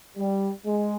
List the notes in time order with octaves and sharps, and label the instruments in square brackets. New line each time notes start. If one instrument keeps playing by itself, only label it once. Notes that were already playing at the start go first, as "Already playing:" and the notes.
[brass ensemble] G3
G#3